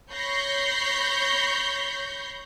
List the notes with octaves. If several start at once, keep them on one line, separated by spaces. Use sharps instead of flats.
C#5 B5 C#6 G6 A#6 C7